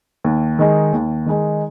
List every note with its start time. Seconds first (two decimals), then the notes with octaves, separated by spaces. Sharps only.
0.24 D#2
0.59 D#3 G#3 D#4
0.93 D#2
1.26 D#3 G#3 D#4